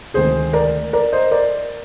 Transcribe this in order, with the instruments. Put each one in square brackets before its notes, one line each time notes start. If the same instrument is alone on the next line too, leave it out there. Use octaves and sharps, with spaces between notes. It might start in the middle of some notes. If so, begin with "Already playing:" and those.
[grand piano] D2 C3 D#3 G#3 G#4 C5
A#4 D5
A#4 D5
C5 D#5
A#4 D5